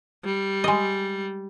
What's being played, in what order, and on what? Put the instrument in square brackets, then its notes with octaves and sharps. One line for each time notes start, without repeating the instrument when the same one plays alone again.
[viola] G3
[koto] G#3 D#5